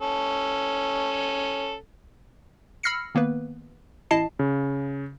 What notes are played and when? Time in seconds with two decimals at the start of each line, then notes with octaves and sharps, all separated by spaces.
0.01 C#4 A4
2.83 B5 E6 F6 A#6 C7 C#7
3.15 D#3 A#3 B3 B4
4.11 A1 E4 D#5 A5 C7
4.39 C#3